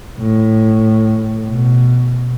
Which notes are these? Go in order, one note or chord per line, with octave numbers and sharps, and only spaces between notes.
A2
B2